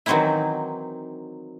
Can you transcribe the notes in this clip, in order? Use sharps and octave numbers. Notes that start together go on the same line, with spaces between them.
D#3 E3 F#3 C4 D#4 E4